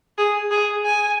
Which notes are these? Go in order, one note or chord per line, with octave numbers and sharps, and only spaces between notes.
G#4
G#4
G#5